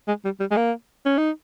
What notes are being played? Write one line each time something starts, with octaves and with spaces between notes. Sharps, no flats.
G#3
G3
G3
G#3
A#3
C#4
D#4